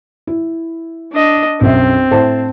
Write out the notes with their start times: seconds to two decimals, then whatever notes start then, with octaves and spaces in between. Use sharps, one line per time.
0.27 E4
1.13 D4 D#5
1.61 B1 F#2 C4 E5
2.11 A2 C5 A5